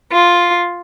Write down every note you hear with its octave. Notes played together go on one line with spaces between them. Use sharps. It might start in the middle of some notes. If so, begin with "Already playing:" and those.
F4